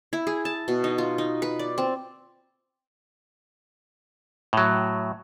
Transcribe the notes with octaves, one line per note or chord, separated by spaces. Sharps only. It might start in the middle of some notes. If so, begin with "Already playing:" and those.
E4
G#4
A5
B2
D#4
F4
D#4
B4
D5
C4
A2 F#3